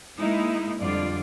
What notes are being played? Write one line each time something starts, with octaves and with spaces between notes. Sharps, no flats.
G#3 A#3 D#4 E4
F2 D3 G3 F4 D5